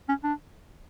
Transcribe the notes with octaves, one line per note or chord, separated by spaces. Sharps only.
C#4
D4